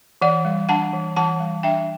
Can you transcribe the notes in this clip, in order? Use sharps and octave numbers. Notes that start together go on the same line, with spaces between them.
E3 D5 F#5
G3
D4 F#5 A5
E3
E3 F#5 A5
G3
D4 E5 G5